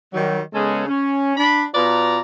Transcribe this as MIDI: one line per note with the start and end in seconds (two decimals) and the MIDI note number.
0.14 0.41 51
0.14 0.41 54
0.14 0.41 55
0.54 0.86 49
0.54 0.86 56
0.54 0.86 59
0.54 0.86 61
0.54 0.86 68
0.54 0.86 69
0.88 1.36 61
1.37 1.64 62
1.37 1.64 83
1.75 2.19 47
1.75 2.19 65
1.75 2.19 71
1.75 2.19 74
1.75 2.19 82